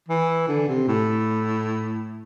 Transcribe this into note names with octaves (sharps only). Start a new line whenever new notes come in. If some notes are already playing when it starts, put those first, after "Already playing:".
E3
D3
C3
A2